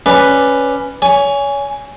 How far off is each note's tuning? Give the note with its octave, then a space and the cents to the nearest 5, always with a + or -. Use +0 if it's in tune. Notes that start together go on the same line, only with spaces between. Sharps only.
C#4 +0 B4 +0 D5 +0
C#5 +30 G#5 +0